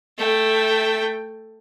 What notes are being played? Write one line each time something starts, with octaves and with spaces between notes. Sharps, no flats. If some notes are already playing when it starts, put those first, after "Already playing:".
A3 G5